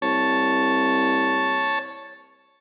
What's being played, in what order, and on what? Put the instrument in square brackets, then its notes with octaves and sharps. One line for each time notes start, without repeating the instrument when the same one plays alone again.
[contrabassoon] C2 [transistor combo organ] C#5 A5